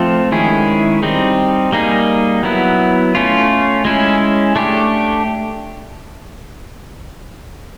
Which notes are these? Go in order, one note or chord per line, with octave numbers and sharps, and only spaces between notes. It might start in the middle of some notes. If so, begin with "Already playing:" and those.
Already playing: F3 A3 C4 F4 A4
D#3 G#3 C#4 E4 G#4
G3 C4 D#4
G3 A#3 D#4 G#4
F#3 B3 E4
A3 C#4 F4
G#3 C#4 E4
A3 D4 G4